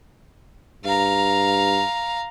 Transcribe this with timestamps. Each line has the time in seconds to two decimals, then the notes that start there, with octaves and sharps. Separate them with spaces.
0.85 G2 F5 A#5